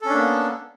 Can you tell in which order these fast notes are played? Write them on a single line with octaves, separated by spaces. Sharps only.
A4 C#4 D4 A#3 B3